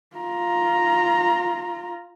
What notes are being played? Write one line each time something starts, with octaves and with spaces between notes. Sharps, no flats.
F4 A#5